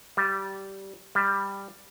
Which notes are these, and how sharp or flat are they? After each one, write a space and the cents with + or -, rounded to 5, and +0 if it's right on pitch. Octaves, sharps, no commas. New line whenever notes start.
G3 -15
G3 +10